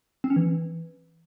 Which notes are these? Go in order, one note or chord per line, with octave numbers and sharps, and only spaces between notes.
C4
C#4
E3